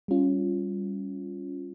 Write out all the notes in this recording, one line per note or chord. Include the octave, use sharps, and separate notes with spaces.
G3 C#4 F4